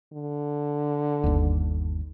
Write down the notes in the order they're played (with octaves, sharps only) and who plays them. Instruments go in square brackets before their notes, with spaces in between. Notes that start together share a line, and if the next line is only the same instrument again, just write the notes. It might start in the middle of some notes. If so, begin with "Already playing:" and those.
[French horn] D3
[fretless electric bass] G1 D#2